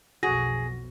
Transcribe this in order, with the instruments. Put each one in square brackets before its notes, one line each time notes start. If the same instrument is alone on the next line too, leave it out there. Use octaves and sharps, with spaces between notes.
[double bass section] B1 F2 [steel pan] F#4 [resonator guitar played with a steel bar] G#4 [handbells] A#6